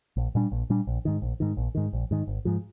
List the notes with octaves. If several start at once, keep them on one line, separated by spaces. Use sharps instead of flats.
A#1
A#2 G3 D4
A#1
A#2 G3 D4
A#1
G#2 D#3
A#1
G#2 D#3
A#1
G#2 D#3
A#1
G#2 D#3
G#1
G#2 F3